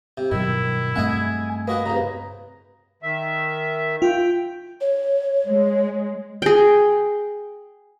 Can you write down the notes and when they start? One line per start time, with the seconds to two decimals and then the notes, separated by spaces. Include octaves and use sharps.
0.18 C3
0.32 G2 B2 D#3 F#3 E4
0.96 G2 A3 C4 D#5 E5 F#5 G#5
1.68 A#3 F#4 B4 D#5 F#5
1.86 C2 C#3 A#5
3.03 D#3 E5
4.02 F4 G5
4.81 C#5
5.47 G#3
6.42 G#4 G5